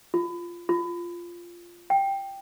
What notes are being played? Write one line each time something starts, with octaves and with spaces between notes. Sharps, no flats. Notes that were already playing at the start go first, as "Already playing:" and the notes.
F4
F4
G5